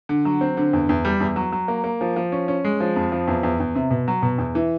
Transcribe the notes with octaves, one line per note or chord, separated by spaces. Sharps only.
D3
F#3
C4
D3
E2
E2
G3
E2
F#3
F#3
A#3
A#3
F3
F3
C#4
C#4
G#3
F3
F2
F3
E2
E2
E2
C3
B2
F#3
B2
E2
E3